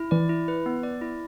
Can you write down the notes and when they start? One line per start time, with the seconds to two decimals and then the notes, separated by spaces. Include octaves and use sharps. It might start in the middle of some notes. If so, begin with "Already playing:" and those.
Already playing: E4
0.11 E3 D5
0.29 E4
0.48 B4
0.66 B3
0.83 D5
1.02 E4